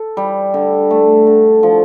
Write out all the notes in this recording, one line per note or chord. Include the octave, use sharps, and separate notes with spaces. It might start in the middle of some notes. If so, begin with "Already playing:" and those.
Already playing: A4
G3
D3
A3
D3
F3